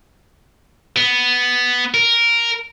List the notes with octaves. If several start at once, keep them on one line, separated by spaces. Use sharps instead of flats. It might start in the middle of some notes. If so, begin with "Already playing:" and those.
B3
A#4